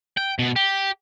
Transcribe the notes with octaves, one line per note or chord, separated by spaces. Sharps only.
G5
B2
G4